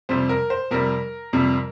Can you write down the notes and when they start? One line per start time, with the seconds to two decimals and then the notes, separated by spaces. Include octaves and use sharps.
0.09 F2 C3 G3 C5
0.29 A#4
0.50 C5
0.71 F2 C3 G3 A#4
1.33 F2 C3 G3